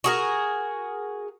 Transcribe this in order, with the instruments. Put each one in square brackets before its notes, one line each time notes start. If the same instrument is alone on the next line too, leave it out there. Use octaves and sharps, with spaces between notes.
[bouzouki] F#4 G#4 A#4